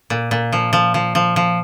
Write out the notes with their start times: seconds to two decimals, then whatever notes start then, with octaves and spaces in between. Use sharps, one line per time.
0.10 A#2
0.31 A#2
0.53 F3
0.73 F3
0.94 F3
1.15 F3
1.36 F3